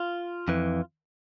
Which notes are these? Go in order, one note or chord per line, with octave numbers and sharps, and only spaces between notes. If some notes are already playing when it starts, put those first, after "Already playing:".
Already playing: F4
F2 E3